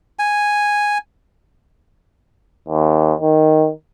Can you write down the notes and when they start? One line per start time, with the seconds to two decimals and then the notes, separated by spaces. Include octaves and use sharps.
0.19 G#5
2.69 D#2
3.21 D#3